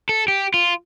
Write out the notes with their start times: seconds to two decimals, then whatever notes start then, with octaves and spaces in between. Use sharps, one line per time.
0.09 A4
0.28 G4
0.54 F4